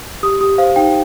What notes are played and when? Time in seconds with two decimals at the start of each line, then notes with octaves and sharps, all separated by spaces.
0.23 G4 D#6
0.41 G4 D#6
0.58 C5 F5
0.76 D#4 G5